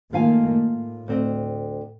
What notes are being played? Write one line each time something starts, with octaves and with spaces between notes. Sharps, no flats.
D#3 A3 A#3 F4 F5 G#5
A2
D2 C4 D#5